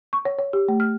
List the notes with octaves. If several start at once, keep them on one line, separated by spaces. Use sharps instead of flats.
C#6
C#5
C#5
G4
A3
F6